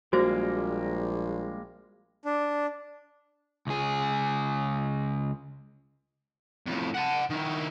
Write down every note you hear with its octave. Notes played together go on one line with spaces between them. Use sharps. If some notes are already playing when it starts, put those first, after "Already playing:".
A#1 G3 G#3 A#3 F#4 C5
D4
C#2 G#4
F2 A2
F#5 A5
D#3 E4